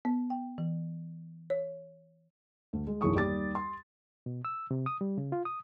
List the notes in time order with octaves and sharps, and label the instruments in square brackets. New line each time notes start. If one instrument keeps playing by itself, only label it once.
[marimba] B3
G5
E3
C#5
[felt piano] D2
G#3
B1 F#2 E3 G#4 C#6 D#6
D#2 G3 G4 D6 A6
C6
[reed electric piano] B2
E6
C3
D#6
G3
C#3
F4
D#6